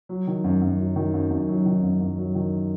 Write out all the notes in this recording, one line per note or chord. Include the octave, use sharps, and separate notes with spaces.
F#3
D#3
F#2
F#2
F#3
D#3
F#2
F#2
F#3
D#3
F#2
F#2
F#3
D#3